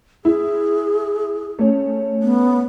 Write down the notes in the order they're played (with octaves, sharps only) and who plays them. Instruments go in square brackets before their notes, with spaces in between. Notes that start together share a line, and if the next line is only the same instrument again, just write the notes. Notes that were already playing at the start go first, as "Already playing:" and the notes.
[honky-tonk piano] E4 [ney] G#4
[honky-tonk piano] A3 C#4
[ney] B3